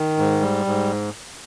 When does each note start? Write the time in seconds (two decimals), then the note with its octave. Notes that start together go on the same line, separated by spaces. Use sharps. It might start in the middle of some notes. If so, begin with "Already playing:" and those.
Already playing: D#3
0.17 G#2
0.41 G3
0.66 G#2